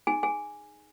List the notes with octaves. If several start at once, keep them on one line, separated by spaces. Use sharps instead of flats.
D#4 G#4 G#5
G#4 G#5